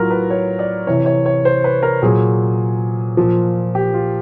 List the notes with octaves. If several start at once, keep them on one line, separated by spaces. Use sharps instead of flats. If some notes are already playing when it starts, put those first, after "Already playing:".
Already playing: A2 F#3 F4 A#4
B4
C#5
D5
C3 E3 C#5
C#5
C#5
C5
B4
A#4
A#2 F#3 G#4
A#2 F3
G4
F4